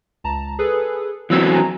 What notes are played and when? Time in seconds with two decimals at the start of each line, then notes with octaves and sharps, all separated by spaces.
0.24 C#2 A5 A#5
0.59 G#4 A4 B4
1.30 E3 F#3 B3 C4 E6 G#6
1.52 G#5 A#5